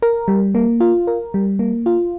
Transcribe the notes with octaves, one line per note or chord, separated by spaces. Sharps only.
A#4
G3
A#3
F4
A#4
G3
A#3
F4